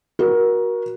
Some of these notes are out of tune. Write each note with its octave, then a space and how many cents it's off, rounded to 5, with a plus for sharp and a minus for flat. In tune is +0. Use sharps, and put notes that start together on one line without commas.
F#4 +0 A#4 +25